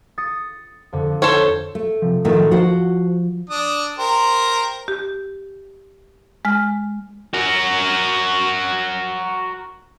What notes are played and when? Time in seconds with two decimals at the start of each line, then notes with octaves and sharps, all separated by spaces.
0.18 D#6 A6 C#7
0.92 F2 D3
1.22 A4 C5 C#5
1.75 A3
2.02 C3 F3
2.25 A2 D#3 F3 F#3 A3
2.51 F3 F#4 C5 F#5
3.50 D4 D#6
3.99 G4 A#4 C5
4.88 G4
6.45 G#3 F6
7.34 F#4 A#4